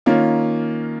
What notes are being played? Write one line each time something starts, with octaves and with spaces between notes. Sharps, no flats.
D#3 A#3 C#4 F4